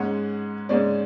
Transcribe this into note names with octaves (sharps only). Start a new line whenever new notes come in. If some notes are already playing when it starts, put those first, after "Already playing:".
Already playing: G#2 G#3 C#4 F#5
G#2 G#3 C#4 D5